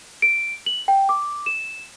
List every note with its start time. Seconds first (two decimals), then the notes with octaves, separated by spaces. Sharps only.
0.22 D7
0.66 F#7
0.88 G5
1.09 D6
1.46 E7